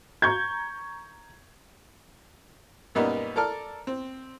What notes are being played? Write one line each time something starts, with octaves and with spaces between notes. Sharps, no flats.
A#5 C#6 G6 G#6
F#2 A#2 G3 A#3 B3 D#4
A4 A#4 D5 A5 F6
C4